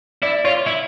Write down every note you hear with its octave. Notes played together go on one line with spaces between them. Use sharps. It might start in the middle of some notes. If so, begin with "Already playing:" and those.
E4 D5
F4 C#5
E4